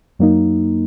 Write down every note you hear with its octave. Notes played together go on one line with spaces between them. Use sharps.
F#2 F#3 A#3 D#4